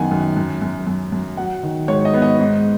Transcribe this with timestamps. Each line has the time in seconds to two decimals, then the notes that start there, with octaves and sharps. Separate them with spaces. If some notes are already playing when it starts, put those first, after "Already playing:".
Already playing: F#2 D#3 B3 F#5 G#5
0.11 F#2
0.37 F#2
0.62 F#2
0.87 F#2
1.12 F#2
1.37 F#3 F#5
1.63 D#3
1.88 G#2 C#5
2.05 D#5
2.14 B3
2.22 D#5
2.39 G#2